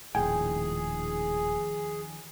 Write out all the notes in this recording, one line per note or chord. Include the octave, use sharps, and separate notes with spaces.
D#1 A2 D#3 F3 G#4 G5 G#5